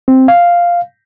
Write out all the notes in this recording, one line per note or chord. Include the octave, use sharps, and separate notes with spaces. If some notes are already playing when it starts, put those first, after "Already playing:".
C4
F5